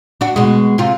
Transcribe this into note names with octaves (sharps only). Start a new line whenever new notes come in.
D4 F#4
B2 G#3
C3 F4